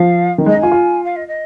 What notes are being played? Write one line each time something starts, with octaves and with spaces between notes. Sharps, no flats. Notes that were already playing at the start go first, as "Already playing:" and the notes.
Already playing: F3 F5
D#3
G#3
D#4 D#5
F4 G#5
F4
F5
D#5
D#5